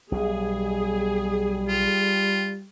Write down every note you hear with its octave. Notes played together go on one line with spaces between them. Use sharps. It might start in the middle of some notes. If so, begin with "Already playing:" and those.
B1 B2 G3 G#4
F4